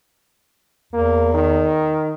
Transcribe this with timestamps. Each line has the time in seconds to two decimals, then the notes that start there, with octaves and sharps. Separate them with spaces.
0.93 E2 A#3
1.34 D#3